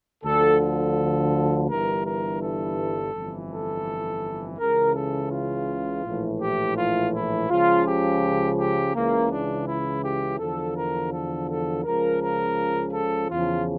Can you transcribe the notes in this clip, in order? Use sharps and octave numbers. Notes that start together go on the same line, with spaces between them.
D2 D3 F3 A4
A4
G1 G2 E3 A#4
A#4
A4
G1 F2 E3
A4
C#2 C#3 E3 A#4
A4
F4
A#1 A2 E3
G4
F4
E4
C#2 C#3 F3 F4
G4
G4
C#2 C#3 E3 A#3
D4
E4
G4
E2 D3 F3 A4
A#4
A4
A4
C#2 C#3 F3 A#4
A#4
A4
E2 C#3 F3 F4